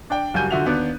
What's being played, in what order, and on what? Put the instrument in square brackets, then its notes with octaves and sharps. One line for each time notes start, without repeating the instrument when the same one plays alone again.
[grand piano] D4 D5 G5
F#1 G3 F#4 G#5 G6 D#7
D3 F4 F#4 E5 F7
D#2 B3 D4